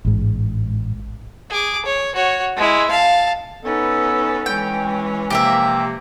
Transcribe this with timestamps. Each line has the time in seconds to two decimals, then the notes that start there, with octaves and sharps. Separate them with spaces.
0.05 A1 G#2
1.50 G#4 D6
1.85 C#5
2.15 F#4 C#5
2.57 G#3 E4
2.90 F5 A5
3.63 B3 C#4 D#4 A4 B4
4.46 E3 G#3 C#4 G5
5.30 C3 F3 A#3 G4 A#4 E5